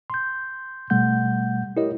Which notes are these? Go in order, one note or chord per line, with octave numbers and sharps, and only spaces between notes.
C6 G6
B2 G3 A3 F#5 G6
E4 G4 A#4 C#5 D#5